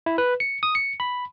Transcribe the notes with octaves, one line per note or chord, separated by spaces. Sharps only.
E4
B4
C#7
D#6
C#7
B5